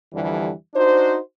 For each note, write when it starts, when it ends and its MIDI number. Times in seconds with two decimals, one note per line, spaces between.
0.13 0.50 41
0.13 0.50 50
0.13 0.50 52
0.13 0.50 55
0.74 1.17 62
0.74 1.17 63
0.74 1.17 66
0.74 1.17 72